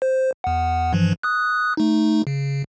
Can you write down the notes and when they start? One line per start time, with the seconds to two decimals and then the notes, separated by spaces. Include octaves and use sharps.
0.02 C5
0.44 E2 F#5
0.93 G2 E3 F3
1.23 D#6 F#6
1.77 A3 D#4
2.27 C#3